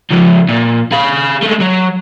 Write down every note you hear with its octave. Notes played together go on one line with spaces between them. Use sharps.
C#3 F3
A#2
G#4 F5
G#3 A3
F#3